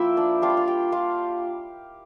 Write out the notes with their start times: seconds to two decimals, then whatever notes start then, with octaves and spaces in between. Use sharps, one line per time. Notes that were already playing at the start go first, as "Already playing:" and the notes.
Already playing: F3 A#3 E4 E5 G5
0.17 D4 D5
0.42 G3 D4 F4 F5
0.50 G5
0.57 F4 F5
0.67 G4 G5
0.92 F4 F5